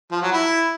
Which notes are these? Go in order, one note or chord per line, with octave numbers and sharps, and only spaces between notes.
F3
F#3
E4